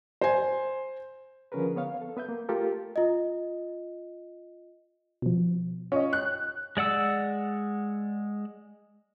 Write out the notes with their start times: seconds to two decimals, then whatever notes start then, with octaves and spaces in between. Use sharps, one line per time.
0.21 C5 G#5
1.52 D3 F3 C#4 G#4 A#4 B4
1.76 B3 C#5 F5
2.01 A4
2.17 B3 B4 E5 G6
2.29 A#3
2.49 A3 F4 G4 A4 A#4
2.96 F4 D#5
5.22 B2 F3
5.92 C#4 F4 D#5
6.13 F#6
6.77 G#3 D5 F#5 E6